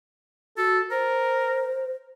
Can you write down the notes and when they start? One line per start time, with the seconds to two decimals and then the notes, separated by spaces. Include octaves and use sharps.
0.57 F#4 A4
0.91 A#4 C5